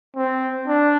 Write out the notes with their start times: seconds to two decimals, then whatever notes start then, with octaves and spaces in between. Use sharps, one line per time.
0.16 C4
0.67 D4